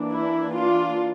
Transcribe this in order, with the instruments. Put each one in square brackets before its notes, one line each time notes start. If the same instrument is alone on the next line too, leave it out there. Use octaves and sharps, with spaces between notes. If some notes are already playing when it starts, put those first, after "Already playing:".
Already playing: [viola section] E3 A#3 D4
E4
D4 F4